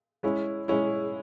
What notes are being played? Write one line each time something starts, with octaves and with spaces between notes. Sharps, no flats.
G#3 C#4 E4
G#3 C#4 E4